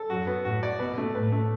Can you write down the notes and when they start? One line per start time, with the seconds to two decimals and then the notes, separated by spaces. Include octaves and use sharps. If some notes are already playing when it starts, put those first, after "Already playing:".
Already playing: A4
0.10 F#2 F#4
0.27 B3
0.45 A2 F#4
0.63 D5
0.79 B2 B4
0.98 A3
1.15 A2 B4
1.32 A3